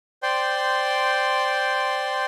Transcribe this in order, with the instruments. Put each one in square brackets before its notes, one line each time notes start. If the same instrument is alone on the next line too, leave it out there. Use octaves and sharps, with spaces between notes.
[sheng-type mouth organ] C5 D5 G5 C6